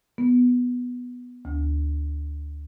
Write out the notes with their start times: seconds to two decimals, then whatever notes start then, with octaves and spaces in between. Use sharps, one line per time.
0.18 B3
1.45 D2